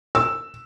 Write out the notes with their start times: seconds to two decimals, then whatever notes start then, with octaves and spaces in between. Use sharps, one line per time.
0.15 E6